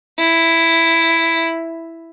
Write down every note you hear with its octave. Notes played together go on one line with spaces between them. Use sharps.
E4